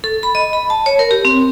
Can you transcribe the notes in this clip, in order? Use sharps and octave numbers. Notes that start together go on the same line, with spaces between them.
A4
B5
D#5
B5
A5
C#5
A#4
G4
C4